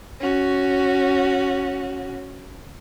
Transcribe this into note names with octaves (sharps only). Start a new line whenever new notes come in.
C#4 F#4